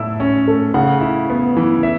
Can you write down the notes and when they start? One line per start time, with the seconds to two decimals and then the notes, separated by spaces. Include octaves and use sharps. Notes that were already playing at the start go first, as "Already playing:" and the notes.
Already playing: A2 E4 E6
0.20 C#4
0.48 A3
0.74 C#3 F#5
1.01 E4
1.30 B3
1.57 E3
1.83 E5